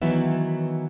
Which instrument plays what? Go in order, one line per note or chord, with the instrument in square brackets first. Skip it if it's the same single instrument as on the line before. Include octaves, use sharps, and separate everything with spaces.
[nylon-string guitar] D#3 E3 F#3 B3 E5